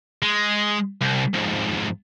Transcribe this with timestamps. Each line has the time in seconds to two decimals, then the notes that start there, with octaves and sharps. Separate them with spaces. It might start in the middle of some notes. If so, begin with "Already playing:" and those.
0.23 G#3
1.01 C2
1.34 F2 G#2